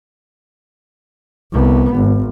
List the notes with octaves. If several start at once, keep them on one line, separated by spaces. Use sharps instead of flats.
C2 B3
G#1